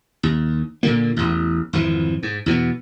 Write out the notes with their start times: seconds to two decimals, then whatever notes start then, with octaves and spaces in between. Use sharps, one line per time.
0.23 D#2
0.83 A#2 D3 A#3
1.16 A1 E2
1.73 G#1 F2 E3 F3
2.23 G#2
2.46 E2 B2 D#3 B3